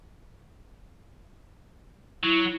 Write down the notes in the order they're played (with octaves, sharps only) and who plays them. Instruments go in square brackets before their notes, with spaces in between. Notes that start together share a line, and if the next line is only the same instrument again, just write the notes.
[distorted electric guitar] F#3 [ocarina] E4